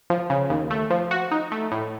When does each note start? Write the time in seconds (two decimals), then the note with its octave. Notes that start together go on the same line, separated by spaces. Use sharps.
0.10 F3
0.30 C#3
0.50 D#2
0.70 A3
0.90 F3
1.11 F#4
1.31 D#4
1.52 A3
1.72 A2